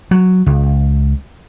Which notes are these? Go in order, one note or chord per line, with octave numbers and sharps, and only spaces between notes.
F#3
C#2